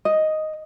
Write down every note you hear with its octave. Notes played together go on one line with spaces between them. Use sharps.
D#5